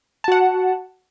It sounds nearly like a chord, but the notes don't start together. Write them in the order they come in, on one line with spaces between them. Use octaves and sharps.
A5 F#4 F#5